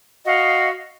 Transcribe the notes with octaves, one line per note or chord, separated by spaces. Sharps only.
F#4 D#5 F5 F#5